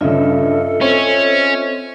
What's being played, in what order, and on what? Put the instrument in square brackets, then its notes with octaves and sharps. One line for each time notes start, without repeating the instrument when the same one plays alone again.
[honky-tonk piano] G2 C#3 [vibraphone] F4 D#5 E5 [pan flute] A4
[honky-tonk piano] C4 C#5 [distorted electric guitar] C#4